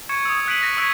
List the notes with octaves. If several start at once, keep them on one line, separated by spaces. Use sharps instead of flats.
C#6 G#6 C#7 E7
D#6 E6
F#6 B6 D7 D#7 F#7
F#6 A#6
C#6 E6 G#6 B6 D7